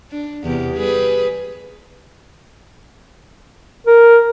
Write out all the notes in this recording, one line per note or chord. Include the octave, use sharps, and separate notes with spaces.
D4
E2 C3 G4
G3 G#4 B4
A#4